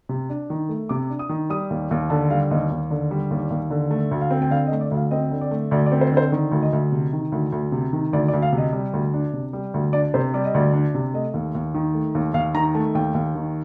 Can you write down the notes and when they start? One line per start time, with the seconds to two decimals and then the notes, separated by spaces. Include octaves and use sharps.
0.09 C3
0.30 D4
0.50 D#3
0.69 A3
0.89 C3 D6
1.10 D4
1.19 D#6
1.29 D#3
1.50 G3 D#6
1.70 D#2
1.91 D#2
2.10 D3 A5
2.30 G3 F5
2.50 D#2 D#5
2.70 D#2
2.91 D3
3.11 G3
3.31 D#2
3.51 D#2
3.70 D3
3.91 A3
4.11 D2
4.21 F5
4.31 C4
4.42 G5
4.51 D3 F5
4.67 D#5
4.72 A3
4.81 D5
4.91 D2
4.96 F5
5.11 C4 D#5
5.31 D3
5.41 D5
5.51 A3
5.71 D2 D5
5.86 D5
5.92 C4
6.01 C5
6.12 D3
6.17 C5
6.32 D#3
6.52 D2
6.63 D#5
6.73 D2
6.92 C3
7.13 D#3
7.32 D2
7.52 D2
7.72 C3
7.93 D#3
8.13 D2 D5
8.28 D5
8.33 D2
8.42 F5
8.53 C3
8.58 D#5
8.73 G3
8.93 D2
9.14 D4
9.33 C3
9.53 G3
9.74 D2
9.93 D4 D5
10.14 C3 C5
10.34 G3 D5
10.45 D#5
10.54 D2 D5
10.73 D4
10.94 C3
11.14 A3 D#5
11.34 D#2
11.55 D#2
11.74 D#3
11.94 A3
12.15 D#2
12.34 D#2 F5
12.54 D#3 A#5
12.75 A3 A5
12.94 D#2 G5
13.14 D#2
13.35 D#3